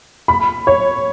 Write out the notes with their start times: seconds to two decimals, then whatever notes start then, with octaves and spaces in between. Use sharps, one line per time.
0.28 B5
0.67 C#5